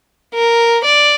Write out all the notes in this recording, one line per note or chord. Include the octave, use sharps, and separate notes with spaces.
A#4
D5